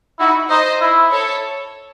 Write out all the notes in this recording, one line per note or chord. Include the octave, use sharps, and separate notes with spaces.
D#4 E4 F#4
D#4 C5 D#5
E4
A4 C#5